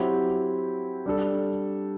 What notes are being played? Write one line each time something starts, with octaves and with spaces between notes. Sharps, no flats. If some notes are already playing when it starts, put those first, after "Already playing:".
Already playing: F#3 C4 E4 G4
G3 D4 A4